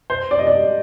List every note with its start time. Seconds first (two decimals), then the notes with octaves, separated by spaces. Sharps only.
0.10 C5
0.31 D5
0.39 D#5
0.47 D5